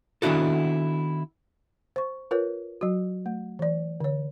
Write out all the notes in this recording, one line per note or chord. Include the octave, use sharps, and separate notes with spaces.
D#3 B3 D4 E4 F#4 A4
C5 C#6
F4 A#4 B4 C#5
F#3 F#4
A3
E3 D5
D3 C#5